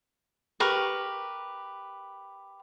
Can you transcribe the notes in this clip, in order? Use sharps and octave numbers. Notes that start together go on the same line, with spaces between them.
G4 A#4 B4 C#6